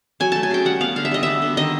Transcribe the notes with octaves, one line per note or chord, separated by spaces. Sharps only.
F#3 G#5
A3 A5
G#5
C#3 G5
G3 F#5
B3 F5
D3 F5
E5
G3 D#5
B3 E5
D3
D#3 D#5